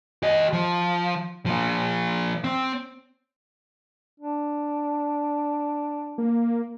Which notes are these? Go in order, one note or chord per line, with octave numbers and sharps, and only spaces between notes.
G4 D#5
F3
F3 A#3
C4
D4
A#3